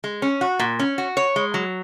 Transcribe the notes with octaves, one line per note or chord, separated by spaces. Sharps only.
G#3
C#4
F#4
A#2
C#4
F#4
C#5
G#3
F#3